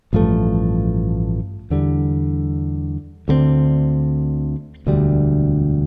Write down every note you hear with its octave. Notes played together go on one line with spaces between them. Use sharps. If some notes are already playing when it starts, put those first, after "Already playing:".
A1 G2 F3 A3
E2 D3 G3
D2 D3 G3 C4
E1 D2 D3 G3